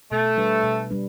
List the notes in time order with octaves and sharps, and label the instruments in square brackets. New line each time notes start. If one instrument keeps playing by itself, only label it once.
[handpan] B2 [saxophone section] A3
[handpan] G3 D4 B4
B2
G3 D4 B4